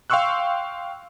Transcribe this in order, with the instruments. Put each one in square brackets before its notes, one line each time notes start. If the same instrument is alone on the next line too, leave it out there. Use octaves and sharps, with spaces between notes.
[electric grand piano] F5 G5 C6 C#6 E6 F#6